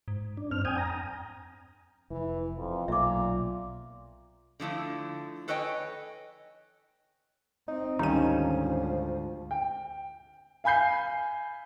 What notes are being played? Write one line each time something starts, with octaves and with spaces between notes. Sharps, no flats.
G#2
D4
G2 C4 F6
F2 G5 G#5 D#6
A#5
F1 E3
F2
B1 A#2 E5 D6
D3 F3 A3 E4
A4 B4 C#5 D#5 G5 G#5
C4 D#4
D2 G#2 D#3 F3 G3 C#4 D#4 D#7
G5
F5 G#5 B5 G6 C7